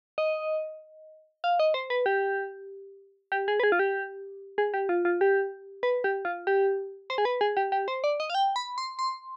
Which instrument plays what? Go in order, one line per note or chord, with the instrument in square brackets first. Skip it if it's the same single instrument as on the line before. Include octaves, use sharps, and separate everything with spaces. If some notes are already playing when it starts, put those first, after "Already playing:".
[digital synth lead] D#5
F5
D#5
C5
B4
G4
G4
G#4
B4
G#4
F4
G4
G#4
G4
F4
F4
G4
B4
G4
F4
G4
C5
G#4
B4
G#4
G4
G4
C5
D5
D#5
F5
G5
B5
C6
C6